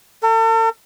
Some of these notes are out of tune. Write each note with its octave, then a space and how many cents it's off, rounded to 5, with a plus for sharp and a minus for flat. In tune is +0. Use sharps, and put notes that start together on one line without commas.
A4 +40